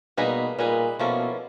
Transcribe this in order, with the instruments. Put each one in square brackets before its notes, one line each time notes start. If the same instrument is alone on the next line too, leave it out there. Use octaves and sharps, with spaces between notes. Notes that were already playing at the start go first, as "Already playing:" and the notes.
[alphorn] B2 [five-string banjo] G3 A#3 D#4 G#4 B4
[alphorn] A#2 [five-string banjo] G3 A#3 D#4 G#4 B4
[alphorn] B2 [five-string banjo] F3 A#3 C#4 E4 A4